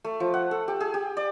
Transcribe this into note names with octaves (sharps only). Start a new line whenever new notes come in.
A3
F3
F#5
A4
G4
G#4
G4
D5